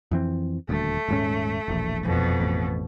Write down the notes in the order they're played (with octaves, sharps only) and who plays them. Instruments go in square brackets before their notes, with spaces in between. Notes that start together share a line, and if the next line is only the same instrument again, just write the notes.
[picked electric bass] F2 E3 C4
[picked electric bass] D#1 D2 [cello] A3
[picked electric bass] D#1 G#2 C#4
E1 A#1
[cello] F2 B2
[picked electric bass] A1